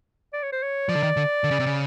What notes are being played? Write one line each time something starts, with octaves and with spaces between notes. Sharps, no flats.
D5
C#5
C5
C#5
F3 D5
D3
D#3
D3
D3
C#3
C3
C#3